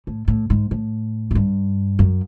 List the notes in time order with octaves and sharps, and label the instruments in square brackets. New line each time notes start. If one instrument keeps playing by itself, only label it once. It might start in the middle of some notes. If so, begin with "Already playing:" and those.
[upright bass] A2
A2
G#2
A2
G#2
G2
F#2